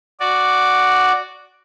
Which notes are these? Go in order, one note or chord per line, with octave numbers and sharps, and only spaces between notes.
F#4 D5